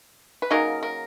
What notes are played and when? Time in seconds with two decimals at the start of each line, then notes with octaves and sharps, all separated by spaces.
0.42 B4
0.50 C#3 F#3 A#3 D#4 A#4
0.83 A#4